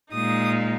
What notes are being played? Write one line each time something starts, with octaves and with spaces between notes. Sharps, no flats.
A#2 G#3 D#4 D#6